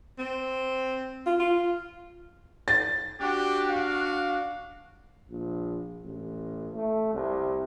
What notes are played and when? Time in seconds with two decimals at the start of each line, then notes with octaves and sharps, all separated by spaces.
0.19 C4
1.26 F4
1.40 F4
2.68 A6
3.20 D4 F#4 G4
3.71 F5
5.30 A#1
6.05 A1
6.74 A3
7.13 C2